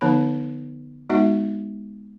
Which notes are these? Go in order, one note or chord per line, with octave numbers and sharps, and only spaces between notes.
D3 F3 B3 D#4 C#5 B5
G#3 B3 D#4 F#4 E5 F#5